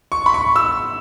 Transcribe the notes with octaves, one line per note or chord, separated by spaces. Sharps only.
C#6
B5
C#6
E6